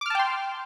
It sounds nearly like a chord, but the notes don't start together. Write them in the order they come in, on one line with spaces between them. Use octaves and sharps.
D6 F6 A5 G5 C6